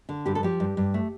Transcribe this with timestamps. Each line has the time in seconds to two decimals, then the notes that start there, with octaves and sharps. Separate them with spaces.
0.09 D3
0.26 G2 G4
0.35 A4
0.43 F3 G4
0.60 G2
0.77 G2
0.94 A3